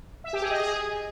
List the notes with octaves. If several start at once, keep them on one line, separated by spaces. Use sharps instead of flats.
E5
G4
G#4
D#5
G#4